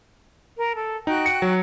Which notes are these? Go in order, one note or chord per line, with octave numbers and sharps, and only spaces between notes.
A#4
A4
D#4 F#4 G5 F#6
C#7
F#3